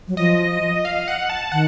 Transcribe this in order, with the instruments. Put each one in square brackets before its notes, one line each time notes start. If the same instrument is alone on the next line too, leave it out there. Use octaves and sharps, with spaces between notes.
[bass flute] F#3
[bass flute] F3 [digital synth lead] D#5
[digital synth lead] F5
F#5
A5
[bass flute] D#3 [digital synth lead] F#5